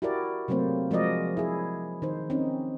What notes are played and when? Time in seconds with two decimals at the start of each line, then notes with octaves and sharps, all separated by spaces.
0.02 E4 F#4 G4 A#4 D5
0.48 C3 F#3 A3 A#3 C4 C5
0.91 F3 G#3 F#4 A#4 D5 D#5
1.37 E4 G#4
2.02 D#3 D#4 C5
2.30 C4 C#4 D#4